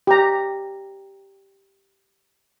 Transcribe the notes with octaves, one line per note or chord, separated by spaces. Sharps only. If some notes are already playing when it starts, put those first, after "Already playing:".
G4 A#5